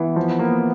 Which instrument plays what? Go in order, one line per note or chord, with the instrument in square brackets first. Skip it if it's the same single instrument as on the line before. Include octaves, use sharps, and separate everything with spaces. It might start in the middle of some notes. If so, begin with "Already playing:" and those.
Already playing: [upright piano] E3 [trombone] B3
[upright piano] F3
A#3